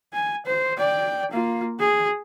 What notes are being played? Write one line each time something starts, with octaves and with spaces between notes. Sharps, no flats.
G#5
C5
D5 G5
A#3 F4
G#4